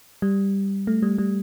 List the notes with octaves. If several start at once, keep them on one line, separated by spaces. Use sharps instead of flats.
G3
A3
G3
G3